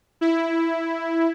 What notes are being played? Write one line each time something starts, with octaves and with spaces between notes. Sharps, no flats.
E4